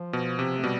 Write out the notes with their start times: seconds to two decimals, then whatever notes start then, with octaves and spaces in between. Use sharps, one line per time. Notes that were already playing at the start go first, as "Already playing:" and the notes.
Already playing: F3
0.13 B2
0.39 C3
0.58 A3
0.63 B2 G3